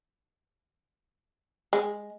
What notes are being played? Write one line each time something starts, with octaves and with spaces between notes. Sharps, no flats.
G#3